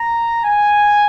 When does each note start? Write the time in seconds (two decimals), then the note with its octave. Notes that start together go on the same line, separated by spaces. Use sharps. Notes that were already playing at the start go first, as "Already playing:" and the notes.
Already playing: A#5
0.44 G#5